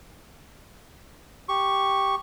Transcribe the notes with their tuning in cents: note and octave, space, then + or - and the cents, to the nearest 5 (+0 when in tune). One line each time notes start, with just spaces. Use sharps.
G4 +0 C#6 +0